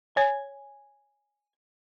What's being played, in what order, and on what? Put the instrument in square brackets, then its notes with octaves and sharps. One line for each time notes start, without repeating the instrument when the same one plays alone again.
[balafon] C#5 [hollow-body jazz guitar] G#5